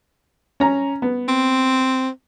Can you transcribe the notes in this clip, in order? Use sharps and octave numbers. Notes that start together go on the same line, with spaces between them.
C#4 A#5
B3
C4